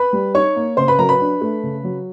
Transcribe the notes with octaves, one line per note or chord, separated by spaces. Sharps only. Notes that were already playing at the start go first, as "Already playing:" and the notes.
Already playing: B4 B5
G3
D#4 C#5 C#6
A#3
C#3 C5 C6
B4 B5
F#3 A#4 A#5
B4 B5
D4
A3
C#3
F#3